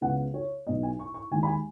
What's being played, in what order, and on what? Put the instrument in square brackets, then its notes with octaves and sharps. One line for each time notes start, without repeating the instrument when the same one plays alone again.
[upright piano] C#2 C#3 B3 F#5
C#5
B1 B2 F#3 B3 D#5
G#5
C#6
C#6
D#2 D#3 G#3 G#5
B5
G#5